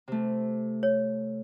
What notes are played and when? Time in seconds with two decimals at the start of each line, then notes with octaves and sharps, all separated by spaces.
0.08 C3 A3
0.83 C#5